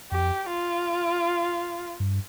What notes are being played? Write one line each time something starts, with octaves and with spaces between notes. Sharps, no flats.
F2 G4
F4
G2